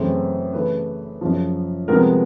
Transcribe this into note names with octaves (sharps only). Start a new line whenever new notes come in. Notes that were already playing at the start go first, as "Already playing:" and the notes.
Already playing: F#2 C#3 E3 A3 C4
C#3 E3 A3 B4
F#2 C#3 F3
C2 C3 F3 G#3 B3 A#4